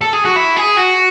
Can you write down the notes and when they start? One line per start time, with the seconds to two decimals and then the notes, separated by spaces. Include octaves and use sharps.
0.01 A4
0.13 G#4
0.25 F#4
0.36 E4
0.57 G#4
0.77 F#4